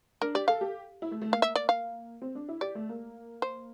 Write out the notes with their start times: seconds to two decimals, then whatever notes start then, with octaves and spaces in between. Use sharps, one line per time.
0.21 D4 A#4
0.35 G4 D5
0.48 A4 F5
0.61 G4
1.02 E4
1.11 A3
1.22 A3
1.31 A#3 F5
1.42 E5
1.56 D5
1.69 F5
2.22 C4
2.35 D4
2.49 E4
2.61 G4 D5
2.75 A3
2.89 A#3
3.42 C5